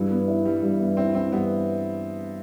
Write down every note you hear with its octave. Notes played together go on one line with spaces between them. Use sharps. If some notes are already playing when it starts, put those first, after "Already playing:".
Already playing: G2 E3
B3
E4
E3 G3
G2
B3
C4 E4
E3 C4
G2 B3